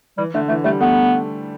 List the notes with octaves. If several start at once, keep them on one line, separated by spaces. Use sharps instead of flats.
E3 G3
D3 A3
E3 A3
G3 A3
A3 B3